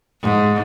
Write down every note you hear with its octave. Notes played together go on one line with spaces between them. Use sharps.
G#2